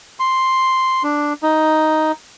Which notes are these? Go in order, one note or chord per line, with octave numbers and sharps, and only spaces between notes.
C6
D4
D#4